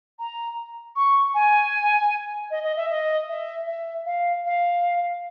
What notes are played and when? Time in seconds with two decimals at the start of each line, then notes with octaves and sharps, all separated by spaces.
0.19 A#5
0.96 C#6
1.34 G#5
2.51 D#5
2.63 D#5
2.77 E5
2.90 D#5
3.28 E5
3.67 E5
4.06 F5
4.45 F5